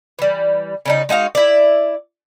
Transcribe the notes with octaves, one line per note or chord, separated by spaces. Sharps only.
E3 G3
C#3 G3 D#4
G#3 D#4 F#4 F5
E4 D5